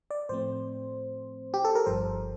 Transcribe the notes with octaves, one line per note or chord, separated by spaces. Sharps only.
D5
A2 F3 A3 C4 C5
G4
A4
A#4
G1 G2 F3 C5